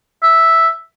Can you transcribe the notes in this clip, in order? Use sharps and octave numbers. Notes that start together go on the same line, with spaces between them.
E5